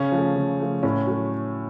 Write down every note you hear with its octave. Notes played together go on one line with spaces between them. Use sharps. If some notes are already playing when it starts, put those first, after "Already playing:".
Already playing: C#3 C#4
F3 A3
C#3
F3 A3
A2 C#4
F#3 A3